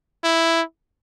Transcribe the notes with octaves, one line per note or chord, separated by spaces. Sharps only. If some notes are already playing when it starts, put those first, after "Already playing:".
E4